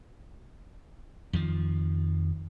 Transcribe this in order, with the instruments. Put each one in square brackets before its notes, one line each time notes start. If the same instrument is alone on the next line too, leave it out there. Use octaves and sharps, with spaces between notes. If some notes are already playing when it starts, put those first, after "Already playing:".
[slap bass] F2 D#3 F3